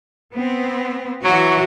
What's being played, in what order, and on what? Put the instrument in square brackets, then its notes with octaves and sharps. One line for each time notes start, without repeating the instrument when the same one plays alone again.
[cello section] B3 C4
[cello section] E3 F#4 [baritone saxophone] F#3